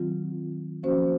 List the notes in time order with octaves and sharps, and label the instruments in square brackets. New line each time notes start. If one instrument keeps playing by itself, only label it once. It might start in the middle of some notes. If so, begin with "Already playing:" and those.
Already playing: [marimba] D#3 F#3 C4 F4
F3 A#3 C#4 F#4 C5